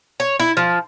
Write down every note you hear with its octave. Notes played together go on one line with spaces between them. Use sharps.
C#5
E4
F3